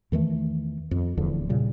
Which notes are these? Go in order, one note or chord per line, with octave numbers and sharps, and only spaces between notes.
E2 D#3 E3 A3
F2
D1 E2 D3 F3
A#2 C#3 G3